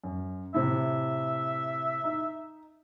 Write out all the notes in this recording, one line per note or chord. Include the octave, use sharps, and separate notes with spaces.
F#2
A2 C3 E5
D#4